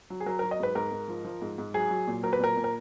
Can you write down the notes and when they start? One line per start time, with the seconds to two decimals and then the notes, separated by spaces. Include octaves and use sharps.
0.10 F#3
0.20 G#4
0.26 F#3 A#4
0.39 A#4
0.44 F#3
0.51 D#5
0.60 G#2 B4
0.75 G#2 A#4
0.92 G#2
1.08 F3
1.25 F3
1.42 G#2
1.58 G#2
1.74 F#3 G#4
1.91 F#3
2.07 A#2
2.23 F#3 A#4
2.33 B4
2.39 A#2 A#4
2.56 A#2
2.64 A#4